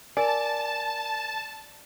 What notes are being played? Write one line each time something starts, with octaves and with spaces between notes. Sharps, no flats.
A#4 D5 G#5 A5